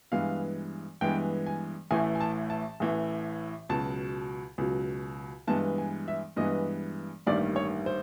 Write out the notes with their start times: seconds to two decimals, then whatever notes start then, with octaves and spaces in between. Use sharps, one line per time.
0.12 G2 E3 G#3 B3 F5
1.01 G2 E3 G#3 B3 G5
1.46 G#5
1.91 A1 A2 E3 A3 G#5
2.15 G#5
2.20 A5
2.50 A5
2.80 A1 A2 E3 A3
3.69 C#2 B2 F#3 A5
4.58 C#2 B2 F#3
5.47 G2 E3 G#3 B3 A5
5.78 G#5
6.08 E5
6.36 G2 E3 G#3 B3 D#5
7.26 A1 G2 D#3 G3 A#3 D5
7.56 C#5
7.86 C5